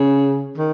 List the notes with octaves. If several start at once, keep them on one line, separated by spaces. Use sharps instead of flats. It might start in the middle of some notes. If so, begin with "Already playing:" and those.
Already playing: C#3
D#3